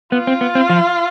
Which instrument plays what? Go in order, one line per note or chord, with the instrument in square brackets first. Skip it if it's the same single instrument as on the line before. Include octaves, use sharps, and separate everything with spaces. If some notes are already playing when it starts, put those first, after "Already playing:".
[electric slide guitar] B3 [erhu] F4
[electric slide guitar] C4
B3
C4
F3